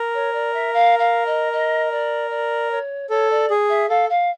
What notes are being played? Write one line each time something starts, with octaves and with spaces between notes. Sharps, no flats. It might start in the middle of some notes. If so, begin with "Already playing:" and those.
Already playing: A#4
C#5
D5
E5
F5
F5
D#5
D#5
D5
D5
C#5
A4 C#5
D5
G#4
E5
A4 F5
F5